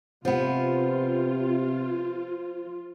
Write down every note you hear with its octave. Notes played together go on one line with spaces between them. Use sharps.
C3 F3 B3 F4